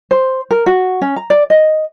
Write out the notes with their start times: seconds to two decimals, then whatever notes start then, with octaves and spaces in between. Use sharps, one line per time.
0.11 C5
0.51 A#4
0.66 F#4
1.02 C#4
1.16 A#5
1.30 D5
1.50 D#5